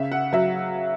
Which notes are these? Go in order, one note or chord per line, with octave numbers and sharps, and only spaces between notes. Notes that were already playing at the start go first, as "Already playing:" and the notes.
Already playing: C#3 E5
F#5
F#3 E5